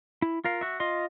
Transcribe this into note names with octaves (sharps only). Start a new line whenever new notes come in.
E4
F4 A#4 F5
F#4 E5
F4 D#5 C6